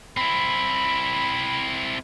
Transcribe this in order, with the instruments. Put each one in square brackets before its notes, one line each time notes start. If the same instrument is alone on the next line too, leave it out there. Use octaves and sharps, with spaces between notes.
[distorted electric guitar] C4 E4 [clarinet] B5